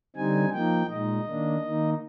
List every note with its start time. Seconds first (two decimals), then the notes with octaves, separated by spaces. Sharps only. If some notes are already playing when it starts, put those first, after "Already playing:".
0.16 D3 G3 C4 D#4 G#5
0.53 F3 A#3 D#4 G5
0.90 A#2 G#3 D#4 D#5
1.27 D#3 A#3 D4
1.65 D#3 A#3 D#4